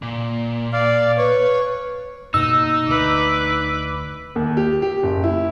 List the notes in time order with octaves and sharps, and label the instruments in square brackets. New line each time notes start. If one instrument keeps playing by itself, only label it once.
[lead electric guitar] A#2
[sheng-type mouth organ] D5 F5
[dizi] B4 [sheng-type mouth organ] C#5
[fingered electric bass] G2 B2 A#3 [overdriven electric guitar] D#4 [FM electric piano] E6
[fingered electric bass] D2 [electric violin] B4 D6
[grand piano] D#2
G4
G4
F#1
E4